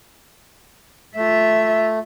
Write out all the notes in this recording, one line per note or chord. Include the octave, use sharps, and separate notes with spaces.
A3 F4 E5